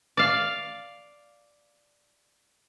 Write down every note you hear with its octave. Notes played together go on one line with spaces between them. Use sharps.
D5 F5